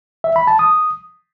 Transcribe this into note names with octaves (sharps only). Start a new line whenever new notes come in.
E5
B5
A5
D#6